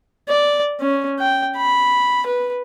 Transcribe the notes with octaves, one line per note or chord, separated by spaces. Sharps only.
D5
C#4
G5
B5
B4